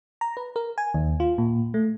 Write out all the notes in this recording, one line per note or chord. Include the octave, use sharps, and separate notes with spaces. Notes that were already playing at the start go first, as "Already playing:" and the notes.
A#5
B4
A#4
G#5
D#2
F4
A#2
A3